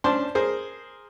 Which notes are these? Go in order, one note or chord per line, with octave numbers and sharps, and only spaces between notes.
C#4 D4 C5 A5 C6
G#4 A#4 C5